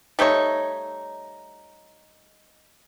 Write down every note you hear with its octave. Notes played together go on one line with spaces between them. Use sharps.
G3 A3 D#4 C#5